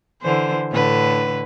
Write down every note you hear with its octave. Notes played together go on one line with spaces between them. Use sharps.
D3 E3 C5
A2 D3 B4